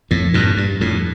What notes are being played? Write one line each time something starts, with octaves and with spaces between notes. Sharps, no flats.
F2 A2
G2 A#2
G2
F2 A2